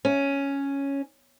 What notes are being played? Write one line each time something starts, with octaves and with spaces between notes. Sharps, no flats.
C#4